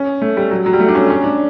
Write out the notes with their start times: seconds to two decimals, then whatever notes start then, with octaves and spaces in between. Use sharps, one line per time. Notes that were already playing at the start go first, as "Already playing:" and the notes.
Already playing: C#4
0.22 A3
0.37 G3
0.51 F#3
0.66 F#3
0.73 G3
0.80 A3
0.88 D4
0.95 C#4
1.10 C#4
1.24 D4